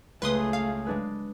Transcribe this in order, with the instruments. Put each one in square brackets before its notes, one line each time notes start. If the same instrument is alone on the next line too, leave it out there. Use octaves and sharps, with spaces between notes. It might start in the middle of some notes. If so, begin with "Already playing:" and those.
[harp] C#2 [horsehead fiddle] A3 G#4 [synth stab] B4 C6 D#6
[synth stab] F5
[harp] G#3 D4 B4